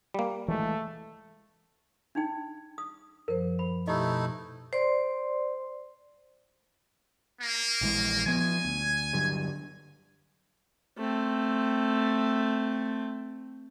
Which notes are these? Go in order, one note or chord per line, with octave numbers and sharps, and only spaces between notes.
G3 A#3
E3 G#3 A3
D4 D#4 G5 G#6
D#6
F#2 F3 A#4 C5
C5 B5
B2 A3 D#4 E4 G4 D#5
C5 D5 C6
A#3
A#1 E3 G#3
F3 B3 G#5
D2
G2 D3 F#3
A3 C4